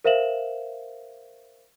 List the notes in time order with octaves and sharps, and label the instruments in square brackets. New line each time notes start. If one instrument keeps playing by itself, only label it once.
[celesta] A#4 C5 E5 F5 E7 F#7